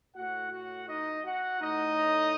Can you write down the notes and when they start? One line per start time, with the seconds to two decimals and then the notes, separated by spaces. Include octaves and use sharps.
0.15 A2 F#4 F#5
0.51 F#4 F#5
0.87 D#4 D#5
1.24 F#4 F#5
1.60 A2 D#4 D#5